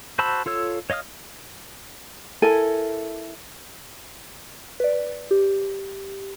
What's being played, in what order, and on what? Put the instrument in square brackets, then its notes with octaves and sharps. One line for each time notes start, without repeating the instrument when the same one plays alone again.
[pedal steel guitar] F#4 C5 A5 B5 E6
F4 A4 C#5 E6
C#5 D#5 F5 D#6 F6
[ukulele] E4 A4 A#4 G#5
[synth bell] B4 D5
G4